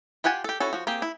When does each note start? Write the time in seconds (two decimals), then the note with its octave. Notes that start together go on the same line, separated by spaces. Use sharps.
0.24 F4 G4 F#5 G#5 A5
0.44 G4 A4
0.60 C#4 E4 F#4 A4
0.73 F3 F#4
0.87 A#3 C4 G4 G#4
1.02 E4